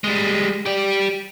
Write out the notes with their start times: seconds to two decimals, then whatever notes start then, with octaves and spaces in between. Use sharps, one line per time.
0.04 G3 G#3
0.66 G4 D5